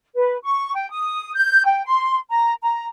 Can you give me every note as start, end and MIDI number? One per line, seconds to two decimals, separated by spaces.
0.15 0.38 71
0.43 0.73 85
0.73 0.90 79
0.91 1.34 87
1.35 1.64 91
1.65 1.83 79
1.85 2.17 84
2.30 2.52 82
2.62 2.86 82